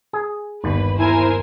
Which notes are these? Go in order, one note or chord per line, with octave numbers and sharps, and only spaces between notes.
G#4
G1 D#2 B4
E4 A#4 C5 G#5